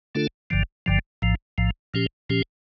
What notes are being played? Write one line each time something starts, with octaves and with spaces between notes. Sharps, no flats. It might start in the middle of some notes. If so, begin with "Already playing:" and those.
D3 A3 D4 F4 A4
G1 G2 D3 F3
G1 G2 D3 F3
A#1 A2 F3
A#1 A2 F3
A#2 F3 C#4 G4
A#2 F3 C#4 G4